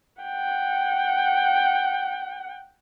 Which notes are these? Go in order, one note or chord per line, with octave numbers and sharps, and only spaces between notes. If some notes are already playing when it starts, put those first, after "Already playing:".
F#5 G5